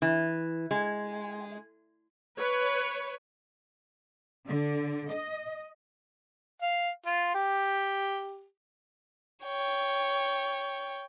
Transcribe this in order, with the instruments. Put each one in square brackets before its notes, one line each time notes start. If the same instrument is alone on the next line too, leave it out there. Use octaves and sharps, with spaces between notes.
[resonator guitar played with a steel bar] E3
G#3
[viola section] B4 C#5
[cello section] D3
D#5
[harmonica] F5
F4
G4
[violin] C#5 G5